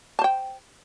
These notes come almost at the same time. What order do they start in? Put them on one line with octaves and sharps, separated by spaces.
A5 C5 G5